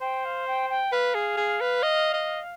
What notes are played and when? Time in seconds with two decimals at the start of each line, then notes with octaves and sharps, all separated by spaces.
0.01 C5 G5
0.24 F5
0.47 G5
0.69 G5
0.92 B4 F5
1.15 G#4
1.37 G#4
1.61 B4
1.83 D#5
2.13 D#5